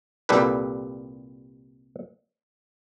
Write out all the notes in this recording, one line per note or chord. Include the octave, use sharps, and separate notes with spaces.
C2 A#2 G3 G4 A4 B4